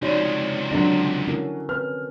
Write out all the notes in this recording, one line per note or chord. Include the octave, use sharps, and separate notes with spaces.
C#2 C3 F3 C#4 D#4 F#4 C#5 D5
D3 F#3 D4 A4 A#6
C#4 E4 F#4 A#4
C4 B4 F6